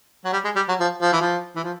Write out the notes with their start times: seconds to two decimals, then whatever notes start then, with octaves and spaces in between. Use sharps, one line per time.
0.25 F#3
0.33 G3
0.45 G#3
0.56 G3
0.68 F#3
0.80 F3
1.02 F3
1.12 E3
1.21 F3
1.56 E3
1.64 F3